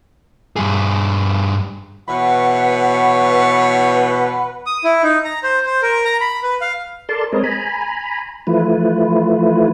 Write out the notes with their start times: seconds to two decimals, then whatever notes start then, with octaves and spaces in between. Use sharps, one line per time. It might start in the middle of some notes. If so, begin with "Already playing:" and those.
0.56 G2 G#4
2.08 B2 E3 B4 C#5 F#5
4.66 D#6
4.84 E4
5.03 D#4
5.25 A#5
5.43 C5
5.66 C5
5.82 A#4
6.05 A#5
6.20 B5
6.43 B4
6.61 F5
7.09 A4 A#4 D5 A5 C6
7.33 G#3 C4 A#4 B4 C#5 D#5
7.44 G#5 A#5 B5
8.47 E3 F3 A3 E4 F4 B4